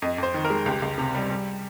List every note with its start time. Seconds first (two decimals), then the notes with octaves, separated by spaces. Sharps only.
0.02 F2 D#5
0.18 F2 C5
0.34 D#3
0.45 A#4
0.50 G#3
0.66 C#2 G4
0.82 C#2
0.98 C3
1.15 G3
1.30 G3